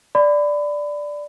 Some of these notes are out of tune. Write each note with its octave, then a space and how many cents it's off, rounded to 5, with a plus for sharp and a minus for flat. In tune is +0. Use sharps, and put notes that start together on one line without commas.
D5 +0 B5 +25